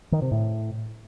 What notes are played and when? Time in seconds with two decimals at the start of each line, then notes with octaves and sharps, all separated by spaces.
0.12 D#3
0.22 C3
0.32 A2